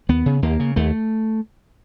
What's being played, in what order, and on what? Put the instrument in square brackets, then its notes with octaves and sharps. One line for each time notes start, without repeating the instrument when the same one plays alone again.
[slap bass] D#2 B3
C#3
D#2 A#3
C#3
D#2 A3